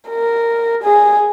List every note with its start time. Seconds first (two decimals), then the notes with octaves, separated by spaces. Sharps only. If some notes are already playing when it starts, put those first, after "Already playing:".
0.09 A#4
0.83 G#4